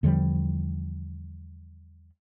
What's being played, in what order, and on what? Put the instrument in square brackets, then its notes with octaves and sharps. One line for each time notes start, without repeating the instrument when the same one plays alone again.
[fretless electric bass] E2 D3 F3 G3